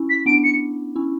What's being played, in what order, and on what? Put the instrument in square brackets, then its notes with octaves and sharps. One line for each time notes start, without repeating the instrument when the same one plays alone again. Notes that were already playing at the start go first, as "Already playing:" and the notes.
Already playing: [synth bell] C#4 E4
[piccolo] B6
[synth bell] B3 D4 [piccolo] D7
[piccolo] C#7
[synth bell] C#4 E4